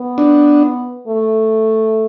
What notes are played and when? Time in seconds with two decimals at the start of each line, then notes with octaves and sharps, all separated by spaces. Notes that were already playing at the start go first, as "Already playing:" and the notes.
Already playing: B3
0.18 D4
1.07 A3